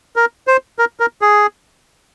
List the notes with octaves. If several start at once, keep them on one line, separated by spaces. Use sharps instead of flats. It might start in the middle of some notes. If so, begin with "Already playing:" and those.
A#4
C5
A#4
A#4
G#4